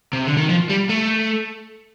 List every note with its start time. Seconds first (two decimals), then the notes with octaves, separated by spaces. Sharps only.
0.13 C3
0.26 D3
0.37 D#3
0.49 F3
0.69 G3
0.89 A3